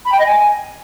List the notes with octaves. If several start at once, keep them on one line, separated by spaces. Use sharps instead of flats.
B5
G5
D#5
G#5